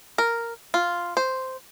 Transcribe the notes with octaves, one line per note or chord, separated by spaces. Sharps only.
A#4
F4
C5